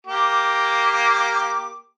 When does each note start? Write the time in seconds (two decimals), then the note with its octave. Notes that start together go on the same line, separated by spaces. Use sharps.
0.07 A#3 G4 D6